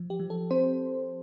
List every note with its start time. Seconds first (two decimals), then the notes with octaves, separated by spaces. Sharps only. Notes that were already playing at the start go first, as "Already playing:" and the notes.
Already playing: F3
0.10 G4
0.20 F3
0.30 A4
0.51 C4 C5